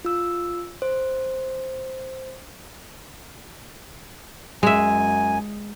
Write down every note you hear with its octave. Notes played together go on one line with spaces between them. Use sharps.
F4 E6
C5
F#2 G#3 E5 G#5